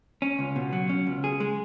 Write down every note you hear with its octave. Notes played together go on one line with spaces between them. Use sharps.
C#4
C#2
B2
F#3
C#4
C#2
G#4
G#3